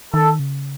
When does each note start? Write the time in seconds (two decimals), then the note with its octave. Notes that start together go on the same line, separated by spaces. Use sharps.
0.14 D#3 A4
0.39 C#3